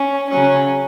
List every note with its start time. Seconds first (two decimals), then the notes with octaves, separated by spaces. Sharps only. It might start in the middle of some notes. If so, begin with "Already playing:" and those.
Already playing: C#4
0.30 C#3 F#3 C#4